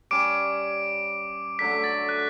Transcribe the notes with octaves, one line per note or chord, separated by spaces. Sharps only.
G3 C#4 G4 D6 D7
D3 F#3 A3 B6
A6
F#6